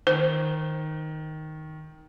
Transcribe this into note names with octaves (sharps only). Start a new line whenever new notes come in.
D#3 C5